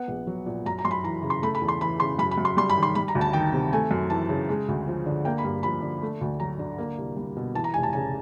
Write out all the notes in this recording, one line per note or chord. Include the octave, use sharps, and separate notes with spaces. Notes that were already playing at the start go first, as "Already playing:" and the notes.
Already playing: B3 F#5
A#1
F#3
A#2
F#2 A#5
A#5
F#2 C6
B5
E3 A#5
C#3
C6
A3 B5
B5
E2
C6
E3 B5
C#3 C6
F#2 B5
B5
F#2
C6
G3 C6
B5
D#3
C6
G3 B5
A#5
D2
A5
D#3 G5
C3
A3 G#5
F#2
E3 A5
C#3
G#3
D2
F3
D3
A#3 G5
B5
G2
F3 B5
D3
A3
D2
F#3 A#5
D3
A#3
C2
G3
B2
E3 A5
A#5
F1 G#5
A5
C#3 G#5